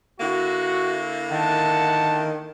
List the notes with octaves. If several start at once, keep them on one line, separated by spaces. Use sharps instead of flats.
D3 A#3 E4 F#4
D#3 F#5 A5